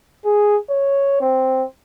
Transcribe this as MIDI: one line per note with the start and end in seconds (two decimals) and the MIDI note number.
0.25 0.57 68
0.70 1.17 73
1.21 1.64 60